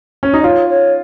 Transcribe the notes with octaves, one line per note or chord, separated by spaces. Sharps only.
C#4
D#4 D#5
F4 C#5
C#5